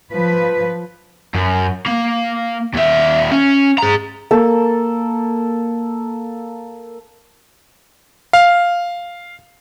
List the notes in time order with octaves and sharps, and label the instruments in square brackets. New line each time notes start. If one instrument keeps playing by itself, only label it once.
[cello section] F3 B4
[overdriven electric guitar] F#2
A#3
D#2 E5
C#4
G#4 A#5
[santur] A#3 A4
[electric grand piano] F5